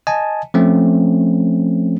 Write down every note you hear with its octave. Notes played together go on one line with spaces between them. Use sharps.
D#5 G#5 A5
F3 A3 C4 C#4